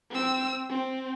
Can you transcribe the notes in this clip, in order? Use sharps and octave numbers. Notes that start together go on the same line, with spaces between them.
C4 E6
C4